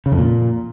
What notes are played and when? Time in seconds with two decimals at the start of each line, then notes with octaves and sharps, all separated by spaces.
0.06 C#3
0.12 F2
0.18 A#2